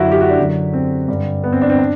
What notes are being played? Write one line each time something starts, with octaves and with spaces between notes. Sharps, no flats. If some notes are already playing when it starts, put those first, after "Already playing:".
Already playing: F#2 D3 E4 F#4
G4
F#4
D4
F#2 D3
C4
G2 D3
B3
C4
D4
C4
D4